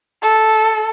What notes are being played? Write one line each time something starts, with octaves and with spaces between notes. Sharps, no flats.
A4